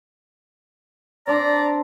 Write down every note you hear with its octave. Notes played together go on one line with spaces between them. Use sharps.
C4 D4 D5 A#5